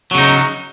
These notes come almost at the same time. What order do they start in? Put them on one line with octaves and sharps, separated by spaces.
F#3 C#3 D#4